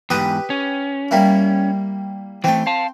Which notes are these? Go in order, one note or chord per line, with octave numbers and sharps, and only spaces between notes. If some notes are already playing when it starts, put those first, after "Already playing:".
E2 G#2 G4 B4 D#6
C#4
G3 A#3 E4
E3 A3 C4 G5
F5 A5